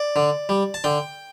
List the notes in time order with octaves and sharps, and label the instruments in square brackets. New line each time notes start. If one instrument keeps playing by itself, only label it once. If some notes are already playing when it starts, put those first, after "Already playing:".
Already playing: [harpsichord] D5
D3
G3
A5
D3 G5